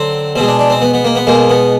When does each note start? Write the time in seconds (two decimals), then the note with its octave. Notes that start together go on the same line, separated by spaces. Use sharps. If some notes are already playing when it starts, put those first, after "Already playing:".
Already playing: D3 F#3 C4
0.36 B2 G#3 C4
0.48 D4
0.59 D4
0.70 C4
0.82 B3
0.93 B3
1.05 A#3
1.15 B3
1.27 B2 G#3 A#3
1.49 B3